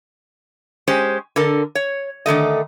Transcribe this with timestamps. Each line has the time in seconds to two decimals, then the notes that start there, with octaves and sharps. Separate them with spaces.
0.87 G#3 C#4 G4 C5
1.36 D3 A4 A#4
1.75 C#5
2.26 D3 D#3 A3 D#5